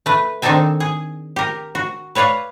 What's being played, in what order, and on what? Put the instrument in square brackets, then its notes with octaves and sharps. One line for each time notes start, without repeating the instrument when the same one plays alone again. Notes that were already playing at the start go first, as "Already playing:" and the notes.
[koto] A3 B4
D#3 C4 D4 D#4 A4 G#5
G#4
G4 A#4
F#4
B4 C#5 D5 F5 F#5